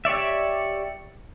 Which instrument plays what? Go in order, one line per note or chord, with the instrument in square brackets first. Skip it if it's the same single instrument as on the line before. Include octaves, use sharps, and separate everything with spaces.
[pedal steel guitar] G4 C#5 D5 E5